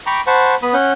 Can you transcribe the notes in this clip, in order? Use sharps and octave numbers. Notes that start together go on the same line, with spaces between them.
G5 A#5 B5 C#6 D6
C5 F#5 A5 B5 C#6
B3 B5 D#6
C#4 F#5 G6